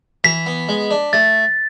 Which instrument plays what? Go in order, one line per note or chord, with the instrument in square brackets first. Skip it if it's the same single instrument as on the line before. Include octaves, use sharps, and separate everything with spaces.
[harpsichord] E3 [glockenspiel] B6
[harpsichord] B3
G#3
D4
[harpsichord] A3 [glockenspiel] A6